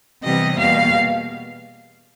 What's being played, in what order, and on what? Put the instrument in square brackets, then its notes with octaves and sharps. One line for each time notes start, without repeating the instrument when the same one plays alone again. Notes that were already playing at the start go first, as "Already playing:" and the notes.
[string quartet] C3 E3 G3 B3 D#5
E2 B2 G3 A#3 F5